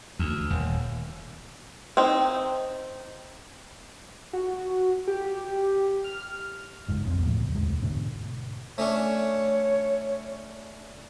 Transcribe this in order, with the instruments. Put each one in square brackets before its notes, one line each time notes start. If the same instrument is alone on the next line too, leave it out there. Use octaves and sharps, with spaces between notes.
[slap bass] D2
D#1
[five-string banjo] C4 D#4
[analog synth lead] F#4
G4
F6
[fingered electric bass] F#1 C#2 G#2
B1 F2 B3 C4
E2 A2 F3
C#2
E1 D2 G#3
G#2 B2 D3
[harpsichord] A3 C#4 D4 [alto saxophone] C#5